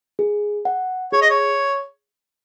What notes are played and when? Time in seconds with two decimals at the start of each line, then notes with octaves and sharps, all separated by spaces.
0.19 G#4
0.65 F#5
1.12 G#4 C#5
1.21 D#5
1.30 C#5